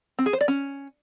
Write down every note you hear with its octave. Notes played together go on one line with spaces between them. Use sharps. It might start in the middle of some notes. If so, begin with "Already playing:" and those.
C4
G#4
C5
D5
C#4